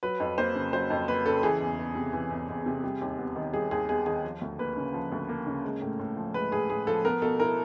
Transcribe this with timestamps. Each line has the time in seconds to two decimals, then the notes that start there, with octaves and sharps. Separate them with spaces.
0.03 F#3 B4
0.20 F2
0.38 A#3 C5
0.55 C#3
0.73 F#3 C5
0.90 F2
1.08 A#3 B4
1.26 C#3 A4
1.43 E3 G#4
1.61 E2
1.79 E2
1.95 C3
2.13 E3
2.31 E2
2.49 E2
2.66 C3
2.84 G3
3.01 D#2
3.18 B3
3.36 D#3
3.53 G3 G#4
3.71 D#2 G#4
3.89 B3 G#4
4.06 D#3 G#4
4.24 F3
4.41 D2
4.59 A#3 B4
4.77 C#3
4.94 F3
5.12 D2
5.29 A#3
5.47 C#3
5.64 G#3
5.82 A2
5.99 A2
6.17 F3
6.34 G#3 B4
6.52 A2 G#4
6.70 A2 G#4
6.87 F3 A4
7.05 B3 A#4
7.22 B2 A4
7.40 E4 A#4